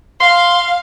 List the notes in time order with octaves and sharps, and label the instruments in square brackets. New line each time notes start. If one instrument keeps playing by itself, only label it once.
[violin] F5 [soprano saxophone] C6